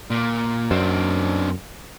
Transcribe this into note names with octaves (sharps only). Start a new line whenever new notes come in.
A#2
F#2 C4 D4